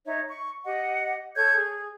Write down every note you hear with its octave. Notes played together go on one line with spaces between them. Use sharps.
D#4 C#5 E5
C#6
G4 D#5 F#5
A4 C#5 G6 G#6
G#4